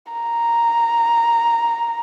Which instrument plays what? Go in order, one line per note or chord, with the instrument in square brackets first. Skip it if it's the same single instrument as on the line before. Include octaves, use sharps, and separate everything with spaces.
[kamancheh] A#5